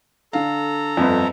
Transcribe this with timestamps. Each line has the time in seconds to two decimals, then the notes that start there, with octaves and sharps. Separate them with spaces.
0.33 D3 A4 F5 A#5
0.97 G1 F2